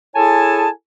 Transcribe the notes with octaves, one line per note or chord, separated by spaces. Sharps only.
E4 G#4 A4 C#5 G#5 A5